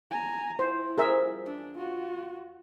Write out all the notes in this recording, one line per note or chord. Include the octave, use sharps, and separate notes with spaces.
G#5 A#5
E4 C5
F3 G3 C4 G#4 A#4 E5
E2 D4
F4 F#4